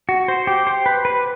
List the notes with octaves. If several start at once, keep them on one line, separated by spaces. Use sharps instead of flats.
F#4
C5
G4
C5
B4
B4